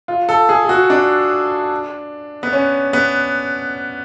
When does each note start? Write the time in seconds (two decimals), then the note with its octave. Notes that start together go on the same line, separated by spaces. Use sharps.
0.08 F4
0.29 A4
0.49 G#4
0.65 G#4
0.69 F#4
0.90 D4
2.43 B3
2.53 C#4
2.93 B3